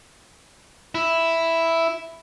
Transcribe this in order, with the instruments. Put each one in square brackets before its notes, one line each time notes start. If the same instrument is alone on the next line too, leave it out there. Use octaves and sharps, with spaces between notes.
[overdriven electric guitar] E4